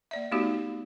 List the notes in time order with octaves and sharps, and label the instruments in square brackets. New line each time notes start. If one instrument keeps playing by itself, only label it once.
[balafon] A#3 D5 E5
A3 B3 D#4 F#4 G4